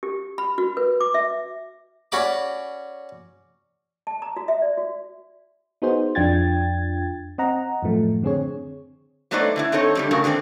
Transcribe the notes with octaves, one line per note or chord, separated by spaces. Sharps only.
G4
B5
F#4
B4
D6
E5
C#4 F#4 D5 B5 D6
A5
A#5
F#4
E5
D5
F#4
B3 D#4 F#4 G#4 C5
F2 D4 F4 G5 G#6 A6
C4 D#5 F#5 A#5
F#2 A2 F3 A3
D3 C4 G#4 C#5
F#3 A3 B3 D#4 C5 D5
D3 D#4 E4
C4 D#4 A4 C#5
D3 G3 C4
G2 C#3 A3 F#4 A#4
D3 D#3 C4 G#4 D5